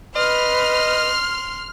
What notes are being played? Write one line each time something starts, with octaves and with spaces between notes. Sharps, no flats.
B4 D#5 C6 F6